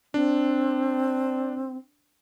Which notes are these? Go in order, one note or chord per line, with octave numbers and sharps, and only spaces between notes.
C4 D4